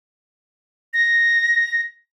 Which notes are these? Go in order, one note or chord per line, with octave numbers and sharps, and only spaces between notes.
A#6